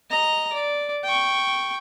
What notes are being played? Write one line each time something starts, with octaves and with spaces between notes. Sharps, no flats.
D#5 A#5
D5
G5 C#6